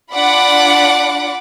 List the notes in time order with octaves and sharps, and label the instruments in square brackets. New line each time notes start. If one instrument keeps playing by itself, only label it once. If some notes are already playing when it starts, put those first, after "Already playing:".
[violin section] D4 F4 D5 F#5 B5 D6